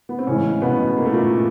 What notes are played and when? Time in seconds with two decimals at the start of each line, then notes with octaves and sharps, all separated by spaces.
0.09 B3
0.19 C4
0.27 A2 C#3 E3 G#3 C#4
0.62 B2 B3
0.98 A#3
1.05 A3
1.12 A#2 A#3